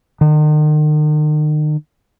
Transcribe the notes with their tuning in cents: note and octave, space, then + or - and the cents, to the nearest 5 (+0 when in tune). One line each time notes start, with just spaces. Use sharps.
D#3 -40